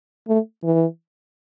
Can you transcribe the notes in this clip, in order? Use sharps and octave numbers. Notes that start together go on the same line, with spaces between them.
A3
E3